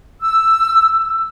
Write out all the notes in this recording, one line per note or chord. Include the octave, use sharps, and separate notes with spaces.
E6